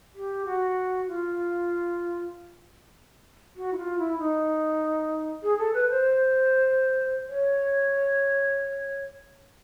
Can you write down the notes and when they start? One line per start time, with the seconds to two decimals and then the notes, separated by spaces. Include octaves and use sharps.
0.15 G4
0.46 F#4
1.08 F4
3.56 F#4
3.73 E4
3.77 F4
3.98 E4
4.18 D#4
5.43 G#4
5.58 A4
5.74 B4
5.89 C5
7.29 C#5